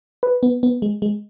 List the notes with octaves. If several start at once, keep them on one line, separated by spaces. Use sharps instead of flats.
B4
B3
B3
G#3
G#3